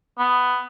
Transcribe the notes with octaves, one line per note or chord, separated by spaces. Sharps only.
B3